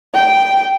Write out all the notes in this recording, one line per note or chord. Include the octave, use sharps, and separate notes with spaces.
G5